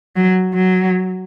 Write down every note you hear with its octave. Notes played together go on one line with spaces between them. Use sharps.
F#3
F#3